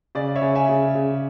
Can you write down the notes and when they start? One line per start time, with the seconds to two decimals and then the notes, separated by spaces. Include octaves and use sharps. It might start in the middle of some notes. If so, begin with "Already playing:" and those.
0.15 C#3 D5
0.35 C#5 E5
0.42 C#3
0.55 E5 G#5
0.69 C#3
0.95 C#3